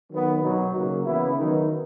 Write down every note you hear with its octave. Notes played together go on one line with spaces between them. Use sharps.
D#3 F#3 B3
B2 F#3 B3 D#4
C#3 F#3 A#3 F#4
C#3 E3 B3 E4
D#3 F#3 B3 D#4